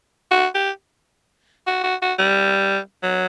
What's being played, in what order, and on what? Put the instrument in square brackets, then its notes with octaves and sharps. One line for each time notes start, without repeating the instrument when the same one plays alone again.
[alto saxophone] F#4
G4
F#4
F#4
F#4
G3
F#3